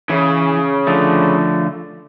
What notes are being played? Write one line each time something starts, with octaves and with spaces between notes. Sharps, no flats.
C#3 E3
D3 F3 A3